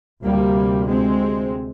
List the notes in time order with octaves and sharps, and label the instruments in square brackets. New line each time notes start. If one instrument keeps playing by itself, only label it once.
[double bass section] D2 C3 G3 A#3
G#3 C4